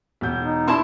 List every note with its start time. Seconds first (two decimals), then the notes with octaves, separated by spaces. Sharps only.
0.21 E1 G6
0.40 D#4
0.68 D4 E4 A5 B5 C6